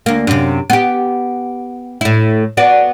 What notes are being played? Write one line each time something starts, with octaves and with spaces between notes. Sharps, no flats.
D2 A#3
F#2 C3
B3 G4
A2 E4
B3 F#4 D5